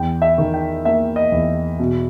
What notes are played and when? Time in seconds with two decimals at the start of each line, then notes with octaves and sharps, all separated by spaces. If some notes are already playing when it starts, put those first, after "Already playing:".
Already playing: E2 G5
0.22 E5
0.38 D#3
0.54 G5
0.85 A#3 E5
1.16 D#5
1.32 E2
1.79 B2